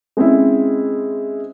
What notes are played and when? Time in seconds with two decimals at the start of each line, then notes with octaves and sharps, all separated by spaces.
0.17 G#3 C4 C#4 E4